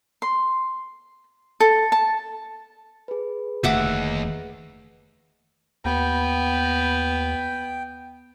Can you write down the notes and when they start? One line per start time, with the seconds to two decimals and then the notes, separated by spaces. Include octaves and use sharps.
0.22 C6
1.60 A4
1.92 A5
3.08 G#4 B4
3.64 F1 D#2 D3 A3 E5 F#5 D6
5.85 D#2 B3 G5